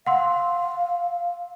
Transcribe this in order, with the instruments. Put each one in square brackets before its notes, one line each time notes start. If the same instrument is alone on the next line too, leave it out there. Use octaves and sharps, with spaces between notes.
[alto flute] F5 [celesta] F#5 C6 E6